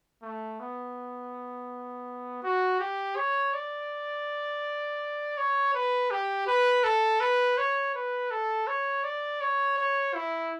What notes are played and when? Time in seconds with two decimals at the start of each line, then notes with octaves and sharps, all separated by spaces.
0.23 A3
0.60 B3
2.43 F#4
2.80 G4
3.16 C#5
3.54 D5
5.38 C#5
5.74 B4
6.11 G4
6.47 B4
6.84 A4
7.20 B4
7.58 C#5
7.95 B4
8.31 A4
8.67 C#5
9.04 D5
9.41 C#5
9.78 C#5
10.15 E4